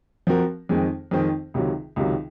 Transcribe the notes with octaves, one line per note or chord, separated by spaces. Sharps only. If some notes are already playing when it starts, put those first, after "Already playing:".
F3 C4 F#4 A#4
F2 D#3 G#3 C4
F2 D#3 G#3 C4
C#2 C3 D#3 F#3
C#2 C3 D#3 F#3